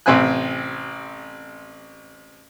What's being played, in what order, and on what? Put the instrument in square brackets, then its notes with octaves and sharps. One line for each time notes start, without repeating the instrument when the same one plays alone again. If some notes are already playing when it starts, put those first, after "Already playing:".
[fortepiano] A1 C3 C4 E5 G#5 F#6